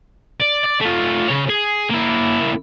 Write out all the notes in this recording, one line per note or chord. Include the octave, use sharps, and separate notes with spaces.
D5
D5
A3 F4
C#3 C#5
G#4
A#3 E4